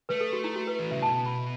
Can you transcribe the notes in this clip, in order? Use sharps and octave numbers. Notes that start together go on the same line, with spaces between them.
A3 B4
A4
F#4
E4
F#4
B4
E3
C#3 E5
B2 A5
B5